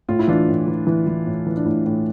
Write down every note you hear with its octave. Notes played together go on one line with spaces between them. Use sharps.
A2 F4
E4
E3 D4 F4
A2
E3
E3
E3
A2
E3
D4
A2 E4
A2